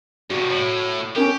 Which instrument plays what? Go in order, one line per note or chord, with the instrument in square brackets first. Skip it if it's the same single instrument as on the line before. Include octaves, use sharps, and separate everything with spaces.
[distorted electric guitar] G2 C3 [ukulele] F#4
[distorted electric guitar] A2
[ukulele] C#4 D#4 A#4 [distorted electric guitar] G4